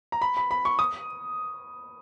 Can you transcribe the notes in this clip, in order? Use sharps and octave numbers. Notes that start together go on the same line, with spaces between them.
A#5
B5
B5
B5
C#6
D#6